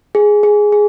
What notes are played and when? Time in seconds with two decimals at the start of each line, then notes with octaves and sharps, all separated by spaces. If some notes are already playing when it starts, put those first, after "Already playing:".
0.15 G#4
0.43 G#4
0.72 G#4